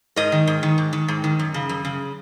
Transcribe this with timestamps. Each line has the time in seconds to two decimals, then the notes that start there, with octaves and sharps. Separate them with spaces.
0.16 G#2 A#4 D#5
0.32 D#3
0.47 G#2
0.63 D#3
0.78 G#2
0.93 D#3
1.08 G#2
1.24 D#3
1.39 F#2
1.54 C#3
1.69 F#2
1.85 C#3